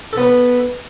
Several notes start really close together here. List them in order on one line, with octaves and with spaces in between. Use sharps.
A4 B3 B4